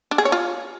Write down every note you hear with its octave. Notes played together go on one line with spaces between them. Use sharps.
D4
G#4
C#5
F4